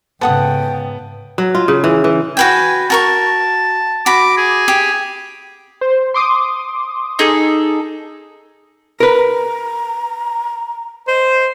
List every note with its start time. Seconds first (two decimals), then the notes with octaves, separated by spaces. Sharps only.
0.21 G#2 C#3 B3 A4 F#5 G5 D#6
1.38 F#3
1.55 F4
1.68 C#3
1.84 E3
2.04 E3
2.37 F#4 B4 G5 G#5
2.90 F#4 A#4 A5 C#6
4.06 F#4 B5 D6
4.38 G#4
4.68 G4
5.81 C5
6.14 C6 D6 D#6
7.19 D#4 G#4 A4
9.00 A#4 B4 A#5
11.08 C5 D#5